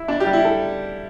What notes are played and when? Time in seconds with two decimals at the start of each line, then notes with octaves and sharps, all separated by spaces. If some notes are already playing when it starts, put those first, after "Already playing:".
Already playing: E4
0.08 D4 D5
0.20 G4
0.26 G3
0.33 E4
0.45 A4